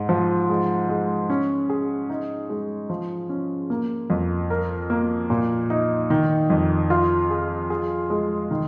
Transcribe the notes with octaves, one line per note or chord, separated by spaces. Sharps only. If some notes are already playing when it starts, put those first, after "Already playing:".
Already playing: G#2
F3
G#3
G#3
C#4
G#4
D#4
G#3
F3
C#4
A#3
F2
A#4
A#3
A#2
D#4
D#3
F2
F4
G#4
G#4
G#3
D#3